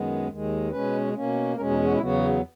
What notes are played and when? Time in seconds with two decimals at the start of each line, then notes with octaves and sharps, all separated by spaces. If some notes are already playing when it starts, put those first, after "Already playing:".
Already playing: F#2 D#3 G#3 B3
0.28 D#2 D#3 G#3
0.71 B2 G#3 C#4 B4
1.14 B2 A#3 C#4
1.56 E2 B2 G#3 C#4 A#4
1.70 D#4
1.84 F#4
1.93 E4
1.99 E2 C#3 F#3 B3 F#4